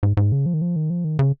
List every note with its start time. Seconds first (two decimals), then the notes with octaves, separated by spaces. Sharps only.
0.03 G#2
0.17 G#2
0.32 C#3
0.46 F3
0.54 D#3
0.62 F3
0.76 D#3
0.90 F3
1.04 D#3
1.19 C#3